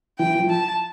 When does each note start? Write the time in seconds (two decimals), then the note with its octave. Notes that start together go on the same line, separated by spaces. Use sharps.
0.19 E3 G5
0.35 E3
0.40 F3
0.49 A5